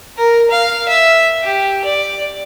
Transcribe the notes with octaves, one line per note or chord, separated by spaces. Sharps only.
A#4
F5
E5
G4
D5